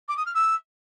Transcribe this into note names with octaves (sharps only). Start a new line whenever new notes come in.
D6
D#6
F6
E6